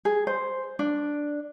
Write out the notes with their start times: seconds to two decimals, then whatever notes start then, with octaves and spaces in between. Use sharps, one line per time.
0.05 G#4
0.27 C5
0.79 D4